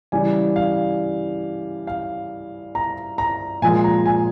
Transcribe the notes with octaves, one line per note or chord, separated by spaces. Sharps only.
C#3 E3 G3 G#5
F5
F5
A#5
A#5
A#2 F3 G#3 G#5
A#5
G#5